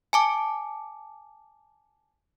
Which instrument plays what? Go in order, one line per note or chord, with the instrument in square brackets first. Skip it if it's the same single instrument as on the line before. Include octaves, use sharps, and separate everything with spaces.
[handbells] G#5 A5 D6